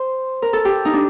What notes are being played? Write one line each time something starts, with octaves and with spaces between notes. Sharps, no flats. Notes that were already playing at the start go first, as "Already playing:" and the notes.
Already playing: C5
A#4
A4
G4
D#4
D4